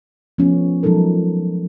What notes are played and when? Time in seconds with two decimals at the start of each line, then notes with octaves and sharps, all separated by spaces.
0.38 F3 A3 B3 C#4
0.83 F3 F#3 G#3 D#4 A4 A#4